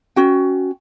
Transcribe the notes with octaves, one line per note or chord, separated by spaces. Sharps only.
C#4 F#4 G5